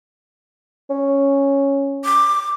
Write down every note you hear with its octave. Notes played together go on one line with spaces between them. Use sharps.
C#4
D6